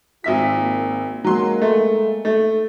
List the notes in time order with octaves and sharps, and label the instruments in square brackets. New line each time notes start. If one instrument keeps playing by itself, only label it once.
[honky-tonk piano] G#1 E5 B6 [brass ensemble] F4
[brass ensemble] A#3
[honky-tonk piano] F#3 C6 [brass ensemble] G#3 A#3
[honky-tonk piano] A3
A3